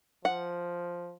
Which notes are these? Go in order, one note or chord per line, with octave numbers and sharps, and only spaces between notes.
F3 F#5